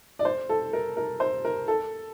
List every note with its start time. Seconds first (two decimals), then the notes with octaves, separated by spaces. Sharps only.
0.19 D5
0.25 C5
0.49 A4
0.73 A#4
0.97 A#4
1.20 C5
1.45 A#4
1.68 A4